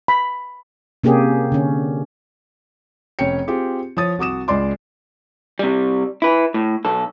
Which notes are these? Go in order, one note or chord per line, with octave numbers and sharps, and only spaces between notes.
B5
C3 A#3 C#4 G4 G#4
D3 C#4
F1 C#4 C#5 G5 C#7
C4 F4 G4 G#4
F3 C#5 D#6 A6
C2 F#4 D6 D#6 E7
C#2 G#3 D5 C6 D6
C3 G3
E4 B4
A2
B1 A4